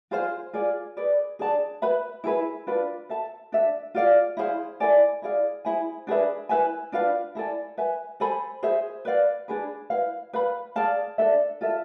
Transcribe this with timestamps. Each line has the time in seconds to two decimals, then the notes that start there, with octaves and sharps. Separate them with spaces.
0.11 F4 G#4 C5 F5
0.54 F4 G#4 D5
0.97 G#4 B4 D5
1.39 D4 G#4 D5 A5
1.82 B4 E5 B5
2.24 E4 G#4 B4 E5
2.67 D4 F4 B4
3.09 A4 E5 A5
3.52 D4 A4 E5
3.95 F4 G#4 D5 F5
4.37 E4 G#4 C5 F5
4.80 E4 A4 D5 G#5
5.22 E4 G#4 D5 F5
5.65 E4 G#4 C5 G#5
6.07 D4 G#4 B4 E5
6.49 E4 B4 E5 G#5
6.92 D4 F4 B4 F5
7.35 E4 A4 D5 G#5
7.78 B4 E5 G#5
8.20 A4 C5 G#5 B5
8.63 G#4 C5 E5
9.05 B4 D5 F5
9.48 D4 G#4 B4
9.90 E4 B4 F5
10.33 B4 F5 B5
10.76 G#4 D5 F5 A5
11.18 D4 A4 E5
11.61 F4 A4 E5